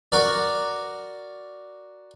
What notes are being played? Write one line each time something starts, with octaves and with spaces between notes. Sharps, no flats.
F#4 A#4 D5